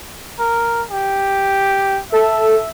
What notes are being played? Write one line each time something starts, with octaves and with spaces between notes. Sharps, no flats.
A#4
G4
A4 E5